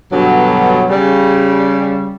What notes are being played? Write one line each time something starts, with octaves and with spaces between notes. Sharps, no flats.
G2 B2 D3 F#3
C#3 G3